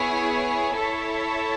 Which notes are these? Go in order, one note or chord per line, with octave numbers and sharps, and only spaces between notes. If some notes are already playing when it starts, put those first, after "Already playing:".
Already playing: B3 E4 G#4 C#5 G#5
E4 A4 C#5 E5 A5